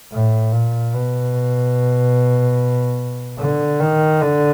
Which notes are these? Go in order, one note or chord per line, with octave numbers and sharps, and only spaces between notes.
A2
A#2
B2
D3
D#3
D3